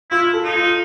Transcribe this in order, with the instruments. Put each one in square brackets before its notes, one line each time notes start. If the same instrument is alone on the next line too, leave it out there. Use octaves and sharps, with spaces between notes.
[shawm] E4 [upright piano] F4
[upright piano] A4
[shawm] D#4
[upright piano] F4